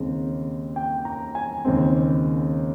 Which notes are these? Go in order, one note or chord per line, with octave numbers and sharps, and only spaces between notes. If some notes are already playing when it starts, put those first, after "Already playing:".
Already playing: D#2 C#3 G#3 C4
G5
A#5
G#5
D#2 C#3 G#3 C4